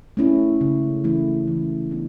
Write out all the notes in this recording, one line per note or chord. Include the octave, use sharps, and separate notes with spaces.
A3 C#4 E4
C#3
E3 A3 E4
E3
B3 D4